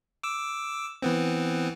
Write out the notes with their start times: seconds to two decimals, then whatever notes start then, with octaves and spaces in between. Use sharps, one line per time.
0.23 D6 E6
1.02 E3 B3 C4